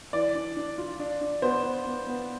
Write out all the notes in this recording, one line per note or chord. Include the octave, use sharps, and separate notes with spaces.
E3 D5
D4
D4
F4
D4
D4
B3 C5
B3
B3
B3